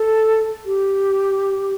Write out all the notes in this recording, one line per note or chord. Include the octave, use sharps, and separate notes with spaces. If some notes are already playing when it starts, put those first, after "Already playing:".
Already playing: A4
G4